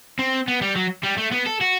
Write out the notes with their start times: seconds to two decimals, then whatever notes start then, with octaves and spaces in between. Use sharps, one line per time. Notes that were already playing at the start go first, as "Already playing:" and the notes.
0.19 C4
0.48 B3
0.62 G3
0.76 F#3
1.04 G3
1.18 A3
1.32 B3
1.47 A4
1.61 F#4